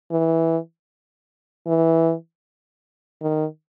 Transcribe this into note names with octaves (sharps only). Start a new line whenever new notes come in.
E3
E3
D#3